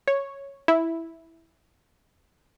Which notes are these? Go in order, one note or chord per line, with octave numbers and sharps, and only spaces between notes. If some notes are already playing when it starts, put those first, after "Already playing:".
C#5
E4